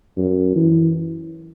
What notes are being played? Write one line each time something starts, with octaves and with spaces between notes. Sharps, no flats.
F#2
E3